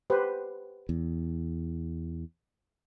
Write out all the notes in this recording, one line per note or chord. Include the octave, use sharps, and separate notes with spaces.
G4 B4 C5
E2